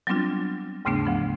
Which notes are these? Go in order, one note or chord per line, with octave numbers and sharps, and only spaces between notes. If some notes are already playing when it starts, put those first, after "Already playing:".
F#3 G3 B3 C4 D4 F4
D#2 G#2 C#3 A3 B3 D4
D2 F3 B3